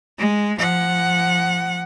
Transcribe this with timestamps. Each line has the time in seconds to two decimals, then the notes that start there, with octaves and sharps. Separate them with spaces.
0.18 G#3
0.59 F3 F#5